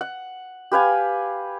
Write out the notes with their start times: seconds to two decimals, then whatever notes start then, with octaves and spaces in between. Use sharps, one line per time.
0.01 F#5
0.72 G4 B4 F5 G#5